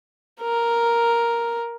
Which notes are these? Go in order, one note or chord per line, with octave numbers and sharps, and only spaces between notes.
A#4